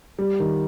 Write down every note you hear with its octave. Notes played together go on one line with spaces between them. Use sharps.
G3
D#3